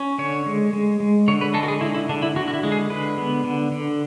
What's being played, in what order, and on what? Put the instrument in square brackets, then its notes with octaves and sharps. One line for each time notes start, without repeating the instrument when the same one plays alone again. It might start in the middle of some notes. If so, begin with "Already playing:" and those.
Already playing: [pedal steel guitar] C#4
D3 C#5
G#3
G#3
G#3
D3 C#5
B4
G#3 A4
F#4
G#4
D3 E4
E4
D3 D4
E4
D3 F#4
F#4
E4
G#3
G#4
D3 B4
B3
D3
D3